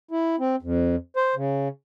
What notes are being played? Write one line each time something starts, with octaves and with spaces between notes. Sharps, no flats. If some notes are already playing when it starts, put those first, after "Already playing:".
E4
C4
F2
C5
C#3